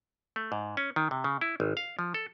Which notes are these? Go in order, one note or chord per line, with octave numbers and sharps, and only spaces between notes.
A3
G#2
C#4
D#3
C3
C#3
E4
G#1
F5
F3
A4